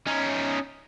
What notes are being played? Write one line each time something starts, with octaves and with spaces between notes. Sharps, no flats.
C#4 D#4